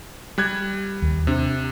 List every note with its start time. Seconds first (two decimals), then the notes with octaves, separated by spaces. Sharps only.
0.38 G3 F#6 G#6
1.02 D#2
1.27 C3 D4